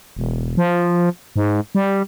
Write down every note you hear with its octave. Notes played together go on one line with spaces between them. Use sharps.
E1
F3
G#2
G3